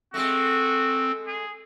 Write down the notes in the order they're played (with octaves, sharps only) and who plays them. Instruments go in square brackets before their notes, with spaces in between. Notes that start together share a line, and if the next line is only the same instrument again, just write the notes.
[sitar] G#3 A3 [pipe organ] C4 [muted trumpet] F#4
[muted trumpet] G#4